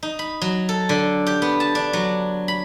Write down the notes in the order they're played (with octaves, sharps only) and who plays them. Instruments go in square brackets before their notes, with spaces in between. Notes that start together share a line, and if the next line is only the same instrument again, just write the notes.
[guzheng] D#4
B5
F#3
A4
D3
G4
B3
A5
D4
F#3
B5